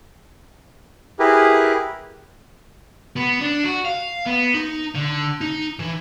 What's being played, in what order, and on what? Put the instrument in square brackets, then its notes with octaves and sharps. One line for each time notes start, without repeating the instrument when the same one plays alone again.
[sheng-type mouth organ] E4 G4 G#4 A#4 B4
[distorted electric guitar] B3
D4
F#4
F5
B3
D#4
D3
D#4
E3